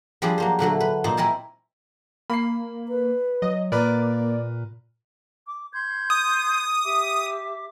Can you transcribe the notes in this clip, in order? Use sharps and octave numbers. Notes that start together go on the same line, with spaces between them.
F3 G3 C4 D4 G#4
F#3 A#3 C5
A#2 D3 F#3 A3
B4
A#2 D#4 C5
C4 E4 A#4 G#5 A5
A#3 B5 C7
B4
F#3 D#5
A#2 A#3 A#4 B4 D5
D6
C6 G6 G#6
D#6
G4 E5 D6